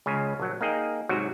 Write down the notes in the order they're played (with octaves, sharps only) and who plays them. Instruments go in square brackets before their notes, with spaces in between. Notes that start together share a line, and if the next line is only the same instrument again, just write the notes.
[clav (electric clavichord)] C#2 C#3 G#5
A#1 F#3
A#3 D#4 G#4 G5
G#2 C3 F#3 F#4